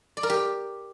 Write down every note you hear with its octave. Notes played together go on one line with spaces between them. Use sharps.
D5
A#4
G4